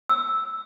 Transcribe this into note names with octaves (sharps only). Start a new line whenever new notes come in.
E6